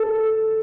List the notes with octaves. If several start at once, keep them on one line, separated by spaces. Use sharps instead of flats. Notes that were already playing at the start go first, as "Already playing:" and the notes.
Already playing: A4